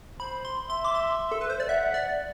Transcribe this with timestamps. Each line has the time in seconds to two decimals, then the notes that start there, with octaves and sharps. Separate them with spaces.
0.20 C5 B5
0.45 C6
0.70 E5 C6
0.85 D6
0.95 C6
1.32 A4
1.41 B4
1.50 C5
1.60 D5
1.69 E5 F#5
1.94 D5